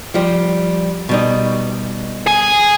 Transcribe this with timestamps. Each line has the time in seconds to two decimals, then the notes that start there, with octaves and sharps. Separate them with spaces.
0.14 F3 G3
1.09 B2 G3 D#4
2.26 G#4 G#5